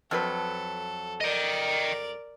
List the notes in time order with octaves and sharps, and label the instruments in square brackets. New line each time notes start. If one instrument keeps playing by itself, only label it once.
[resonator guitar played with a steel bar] F2 F#3 B4 [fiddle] A4
[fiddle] A#4 D5 [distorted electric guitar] D#5 G5